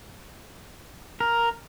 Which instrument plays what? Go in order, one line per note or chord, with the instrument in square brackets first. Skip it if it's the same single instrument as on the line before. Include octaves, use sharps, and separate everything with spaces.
[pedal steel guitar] A#4